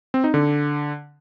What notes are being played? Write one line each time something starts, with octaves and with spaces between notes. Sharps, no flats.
C4
D#4
D3